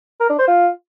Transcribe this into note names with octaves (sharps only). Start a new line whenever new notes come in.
A#4
D4
C5
F4